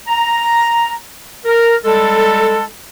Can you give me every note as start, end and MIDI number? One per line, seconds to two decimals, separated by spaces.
0.08 0.94 82
1.45 1.75 70
1.85 2.64 55
1.85 2.64 56
1.85 2.64 69